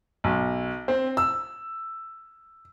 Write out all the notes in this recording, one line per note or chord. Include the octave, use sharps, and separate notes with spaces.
B1
C4
E6